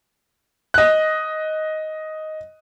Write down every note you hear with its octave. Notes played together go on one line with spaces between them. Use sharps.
D#5 F#6